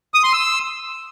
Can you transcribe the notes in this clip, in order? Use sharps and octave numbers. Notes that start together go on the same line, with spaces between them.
D#6
C6
E6